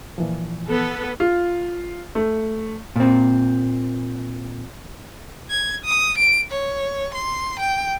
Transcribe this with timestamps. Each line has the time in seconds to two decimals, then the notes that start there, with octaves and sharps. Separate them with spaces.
0.18 A#2 E3 F3
0.69 B3 A4 B4
1.20 F4
2.15 A3
2.96 A#2 C4
5.50 G#6
5.85 D#6
6.18 D7
6.51 C#5
7.14 C6
7.60 G5